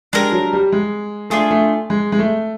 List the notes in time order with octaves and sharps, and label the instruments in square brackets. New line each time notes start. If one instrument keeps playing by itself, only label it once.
[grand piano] G#3 [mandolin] D4 G4 A#4
[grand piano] F#3
G3
G#3
[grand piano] A3 [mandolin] D4 F4 G#4
[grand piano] A3
G#3
G#3
A3